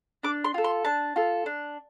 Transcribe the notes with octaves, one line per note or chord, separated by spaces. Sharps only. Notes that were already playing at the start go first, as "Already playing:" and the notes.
D4 D6
C6
F4 A4
C6
D4 A5
F4 A4
D4